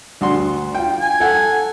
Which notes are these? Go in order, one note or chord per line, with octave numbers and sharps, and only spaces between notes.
D2 F#4 C6
F4 G5
G#5
A4 F#5